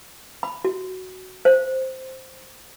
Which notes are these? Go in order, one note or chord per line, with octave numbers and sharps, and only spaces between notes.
B5
F#4
C5